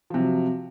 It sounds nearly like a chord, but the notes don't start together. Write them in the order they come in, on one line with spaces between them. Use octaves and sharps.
F3 C3 F#3